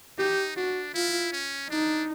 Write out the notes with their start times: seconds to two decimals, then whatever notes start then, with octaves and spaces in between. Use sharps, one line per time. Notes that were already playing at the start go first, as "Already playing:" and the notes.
0.18 D#4 G4
0.56 D4 F#4
0.94 E4 F4
1.32 C#4
1.70 D4 D#4